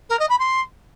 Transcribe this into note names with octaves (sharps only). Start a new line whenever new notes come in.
A#4
D#5
B5
C6